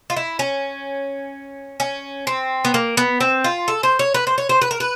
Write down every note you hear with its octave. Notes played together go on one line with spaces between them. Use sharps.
F4
E4
C#4
C#4
C4
B3
A#3
B3
C4
F4
A4
C5
C#5
B4
C5
C#5
C5
B4
A#4
B4